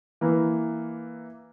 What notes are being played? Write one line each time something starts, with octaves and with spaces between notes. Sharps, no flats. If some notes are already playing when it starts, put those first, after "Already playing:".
E3 A#3